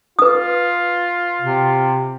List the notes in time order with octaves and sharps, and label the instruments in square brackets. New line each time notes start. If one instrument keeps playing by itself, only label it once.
[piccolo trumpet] F4 [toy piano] B4 D#6
[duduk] C3